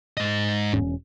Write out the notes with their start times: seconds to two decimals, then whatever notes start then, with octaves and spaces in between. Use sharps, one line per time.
0.17 G#2 D#5
0.73 E1 C#4